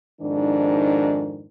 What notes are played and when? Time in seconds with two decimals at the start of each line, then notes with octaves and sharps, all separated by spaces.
0.20 F2 G#2 D#3 D4